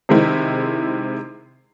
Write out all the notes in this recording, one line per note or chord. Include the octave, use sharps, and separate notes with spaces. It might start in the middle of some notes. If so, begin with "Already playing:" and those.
C3 D#3 G#3 C4 E4